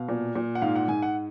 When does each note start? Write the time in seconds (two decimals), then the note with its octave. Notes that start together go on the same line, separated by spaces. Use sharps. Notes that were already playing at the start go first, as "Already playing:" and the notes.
Already playing: B2 F5
0.09 A#2
0.35 A#2
0.55 F#5
0.62 G#2 F5
0.76 F#5
0.88 G#2 G#5
1.02 F#5